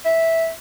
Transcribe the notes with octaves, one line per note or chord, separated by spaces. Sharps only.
E5